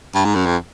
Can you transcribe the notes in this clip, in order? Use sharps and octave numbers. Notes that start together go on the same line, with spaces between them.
G2
G#2
F#2
F2